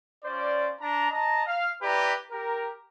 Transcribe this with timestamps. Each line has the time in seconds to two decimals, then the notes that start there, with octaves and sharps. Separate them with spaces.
0.24 C#4 F4 C5 D5
0.81 D4 A5 A#5
1.11 D#5 A5 A#5
1.46 F5
1.82 E4 G4 B4 D5 A#5
2.31 G4 A#4